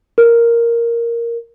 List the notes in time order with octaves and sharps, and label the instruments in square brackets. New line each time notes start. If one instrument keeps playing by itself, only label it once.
[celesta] A#4